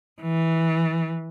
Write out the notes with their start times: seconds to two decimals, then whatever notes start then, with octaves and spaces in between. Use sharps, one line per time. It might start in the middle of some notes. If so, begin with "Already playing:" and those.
0.20 E3